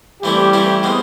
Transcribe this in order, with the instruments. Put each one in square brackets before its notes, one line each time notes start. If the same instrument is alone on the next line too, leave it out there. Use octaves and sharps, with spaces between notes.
[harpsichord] E3 A3 C4 E4 [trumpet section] G3 G4
[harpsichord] E3 A3 C4 E4
B2 G#3 C4